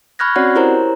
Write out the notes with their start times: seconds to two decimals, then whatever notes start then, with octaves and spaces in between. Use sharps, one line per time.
0.19 B5 C#6 F6 F#6 G#6 A#6
0.36 C4 C#4 F#4 C#5 D5 F#5
0.55 E4 G4 A#4 C5 C#5 A#5